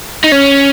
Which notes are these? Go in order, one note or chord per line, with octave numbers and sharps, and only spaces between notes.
D#4
C#4